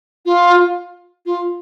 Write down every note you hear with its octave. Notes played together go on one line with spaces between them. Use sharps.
F4
F4